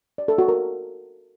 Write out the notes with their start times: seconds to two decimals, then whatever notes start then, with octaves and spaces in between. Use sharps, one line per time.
0.18 D5
0.28 A4
0.38 F#4
0.48 A#4